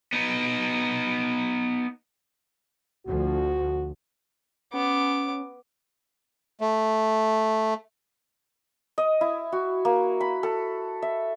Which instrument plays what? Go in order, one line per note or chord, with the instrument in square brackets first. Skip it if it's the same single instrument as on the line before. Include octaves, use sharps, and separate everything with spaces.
[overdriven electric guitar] B3 D#4
[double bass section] D2 F3 [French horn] F#4
[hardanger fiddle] B3 D6 [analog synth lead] C#4
[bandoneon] A3
[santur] D#5
E4
F#4
A#3
B5
A4
E5